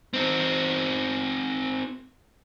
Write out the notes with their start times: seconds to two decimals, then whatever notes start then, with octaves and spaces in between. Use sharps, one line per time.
0.14 C4 D#4